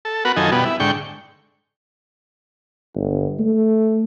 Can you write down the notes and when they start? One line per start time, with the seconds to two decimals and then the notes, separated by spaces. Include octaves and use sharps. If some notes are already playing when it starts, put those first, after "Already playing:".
0.05 A4
0.25 B3 F#4 A#4 B4
0.37 F#2 D#3 F3 D#4 A4 G#5
0.52 B2 G3 B3
0.65 E4
0.80 G#2 D3 G5 C#6
2.95 G1
3.39 A3